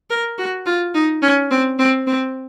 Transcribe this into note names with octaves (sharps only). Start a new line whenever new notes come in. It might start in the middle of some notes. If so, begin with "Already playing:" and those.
A#4
F#4
F4
D#4
C#4
C4
C4
C4